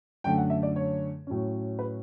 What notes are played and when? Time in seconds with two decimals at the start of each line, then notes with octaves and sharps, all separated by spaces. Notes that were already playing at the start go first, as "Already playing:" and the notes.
0.24 F#2 D3 A3 G5
0.38 F#5
0.50 E5
0.63 D5
0.76 C#5
1.27 A2 F#3 C#4
1.79 B4